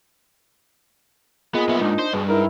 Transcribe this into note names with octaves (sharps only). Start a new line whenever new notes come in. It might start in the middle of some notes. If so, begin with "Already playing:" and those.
A#2 G#3 B3
B1 B3 E5
G#2 D4 D#4
C5
G2 B2 G#4
G#2 E4 A#4